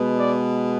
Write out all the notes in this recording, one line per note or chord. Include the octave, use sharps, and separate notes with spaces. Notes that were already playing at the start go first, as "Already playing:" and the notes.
Already playing: B2 G#3 B3
D5